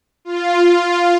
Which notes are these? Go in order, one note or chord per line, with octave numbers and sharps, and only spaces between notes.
F4